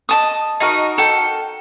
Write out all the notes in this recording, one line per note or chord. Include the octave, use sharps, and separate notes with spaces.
D#5 A5 D#6
D#4 F#4 A#4
A4 G5